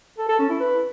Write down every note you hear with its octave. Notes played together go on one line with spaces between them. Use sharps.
A4
A4
C#4
E4
B4